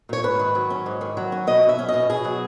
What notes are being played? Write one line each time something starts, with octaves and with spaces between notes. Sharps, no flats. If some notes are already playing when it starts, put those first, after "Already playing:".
A#2 C#5
G#2 B4
D#3
F#3
C#4
G#2
D#3
F#3
C#4
B2 D#5
F#3
E5
C#4
D#5
B2
B2 G#4
F#3